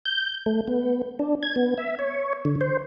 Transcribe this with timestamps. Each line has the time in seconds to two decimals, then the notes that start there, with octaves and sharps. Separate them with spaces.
0.05 G6
0.46 A3
0.68 B3
1.19 D4
1.43 G#6
1.56 B3
1.78 E5
1.99 C#5
2.45 D3
2.61 C5